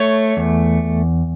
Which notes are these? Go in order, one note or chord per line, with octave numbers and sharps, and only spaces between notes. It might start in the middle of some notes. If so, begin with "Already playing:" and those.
Already playing: A3 C#5
E2